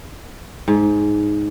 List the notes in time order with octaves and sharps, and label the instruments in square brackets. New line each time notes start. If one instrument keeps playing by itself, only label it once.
[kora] G#2